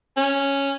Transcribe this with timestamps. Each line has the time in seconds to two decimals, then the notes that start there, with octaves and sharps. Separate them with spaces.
0.17 C#4